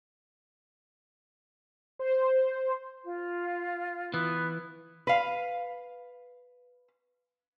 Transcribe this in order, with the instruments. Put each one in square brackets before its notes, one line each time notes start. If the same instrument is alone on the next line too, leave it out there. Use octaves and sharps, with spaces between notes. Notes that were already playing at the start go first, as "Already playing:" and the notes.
[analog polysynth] C5
[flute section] F4
[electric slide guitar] E3 [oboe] B3
[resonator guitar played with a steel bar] B4 F5